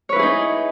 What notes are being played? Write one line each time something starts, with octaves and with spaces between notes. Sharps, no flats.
D#4 E4 G#4 B4 C#5